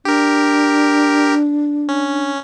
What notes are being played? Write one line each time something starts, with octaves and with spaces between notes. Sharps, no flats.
D4 G4 A#4
C#4